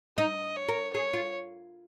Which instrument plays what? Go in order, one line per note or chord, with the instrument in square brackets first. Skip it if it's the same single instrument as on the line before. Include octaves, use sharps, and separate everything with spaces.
[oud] D#4 [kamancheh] D#5
[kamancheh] C#5
[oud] A#4
[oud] G#4 [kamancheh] C#5
[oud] F4